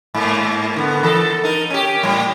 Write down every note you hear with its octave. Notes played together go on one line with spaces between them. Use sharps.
G#2 A#3
D3 B3
E3 A4
D#4 A#4
C#4 G4
A2 G3